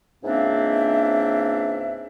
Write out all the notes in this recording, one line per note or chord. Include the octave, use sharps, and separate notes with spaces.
C#2 G#2 A#3 C4 D4 E5